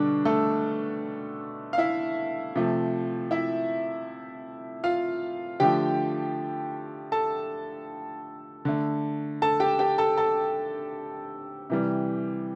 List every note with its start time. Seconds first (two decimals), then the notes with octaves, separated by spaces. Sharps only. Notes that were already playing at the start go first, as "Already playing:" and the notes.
Already playing: B2 D3 G3 D4
0.25 A3 A4
1.73 F5
1.78 E4 E5
2.55 C3 F3 A3
3.31 E4 E5
4.84 F4 F5
5.60 D3 F3 A3 G4 G5
7.12 A4 A5
8.65 D3 A3
9.42 A4 A5
9.60 G4 G5
9.79 G4 G5
9.98 A4 A5
10.17 A4 A5
11.70 C3 E3 G3